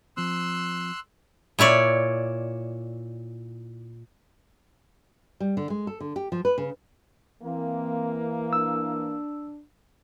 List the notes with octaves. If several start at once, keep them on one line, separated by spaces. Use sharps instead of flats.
F3 C4 C6 E6 F#6
A#2 E4 C#5 D5
G3
D3
G#3
A4
D3
G4
F3
B4
C#3
E3 A#3 C4
D4 E6